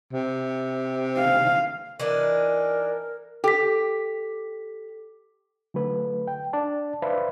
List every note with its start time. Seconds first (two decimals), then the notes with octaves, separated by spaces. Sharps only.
0.12 C3
1.18 F5
2.00 E3 D4 D#4 A#4
3.44 G4 A4 B6
5.74 D3 F#3 A3 B4
6.27 G5
6.53 D4 D5 A5
7.02 B4 C5 D5 E5 F5 B5